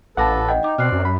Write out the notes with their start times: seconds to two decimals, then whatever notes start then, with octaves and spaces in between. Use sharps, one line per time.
0.17 A1 A4 B4 F5 F#5 A5 D6 A#6
0.48 D#5 F#5 G5
0.63 D#4 D#5 D6
0.78 B2 C4 D5 F6 F#6 C7
0.92 F#2
1.05 B5